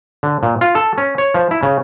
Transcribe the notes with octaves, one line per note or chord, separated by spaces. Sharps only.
D3
A#2
F4
A4
C#4
C#5
F3
E4
C#3